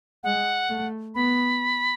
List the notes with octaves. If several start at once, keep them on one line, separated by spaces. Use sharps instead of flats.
G#3 F#5
A3
B3 B5